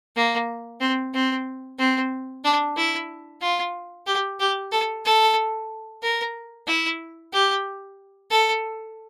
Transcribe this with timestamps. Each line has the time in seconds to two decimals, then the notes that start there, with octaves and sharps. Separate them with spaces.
0.16 A#3
0.81 C4
1.14 C4
1.79 C4
2.44 D4
2.77 E4
3.41 F4
4.07 G4
4.40 G4
4.72 A4
5.05 A4
6.02 A#4
6.67 E4
7.33 G4
8.31 A4